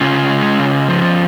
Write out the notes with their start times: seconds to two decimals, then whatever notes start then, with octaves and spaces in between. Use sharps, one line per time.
0.01 C#3 C#4 F4
0.30 G#3
0.59 C#3
0.88 F3